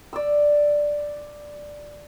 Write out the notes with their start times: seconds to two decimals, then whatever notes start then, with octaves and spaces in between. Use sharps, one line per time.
0.13 D5 E6